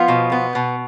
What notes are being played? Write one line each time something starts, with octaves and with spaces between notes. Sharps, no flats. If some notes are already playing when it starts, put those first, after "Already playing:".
Already playing: F3 B3 F4
B2
B3
B2